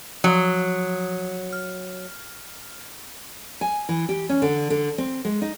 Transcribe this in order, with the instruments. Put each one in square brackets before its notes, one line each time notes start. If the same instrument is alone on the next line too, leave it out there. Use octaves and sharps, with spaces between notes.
[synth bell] F3 D#6 [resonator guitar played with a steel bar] F#3
[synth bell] F6
[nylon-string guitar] G#5
E3
G4
C#4
D3
D3
C4
G#3
D#4